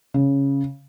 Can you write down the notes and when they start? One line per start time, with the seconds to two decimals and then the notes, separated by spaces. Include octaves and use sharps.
0.14 C#3